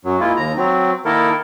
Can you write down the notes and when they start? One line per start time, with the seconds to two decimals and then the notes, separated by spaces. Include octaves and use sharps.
0.05 F#2 F#3
0.20 G#3 A#3 E4 F4
0.37 D#2 A#5
0.57 F#3 C4
1.05 D#3 A#3 E4 A4 A#4